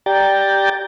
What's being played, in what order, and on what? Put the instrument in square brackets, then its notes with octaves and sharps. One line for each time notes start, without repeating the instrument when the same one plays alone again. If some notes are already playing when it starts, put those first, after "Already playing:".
[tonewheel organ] G4 D5 G5 A#5 G6 A6